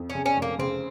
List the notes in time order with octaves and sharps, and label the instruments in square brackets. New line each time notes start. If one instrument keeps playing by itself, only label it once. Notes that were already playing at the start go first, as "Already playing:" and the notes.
Already playing: [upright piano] F2
[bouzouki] C#4
[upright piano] C#3
[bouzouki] C#4
[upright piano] F1
[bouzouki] A#3
[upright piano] C#3 [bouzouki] C4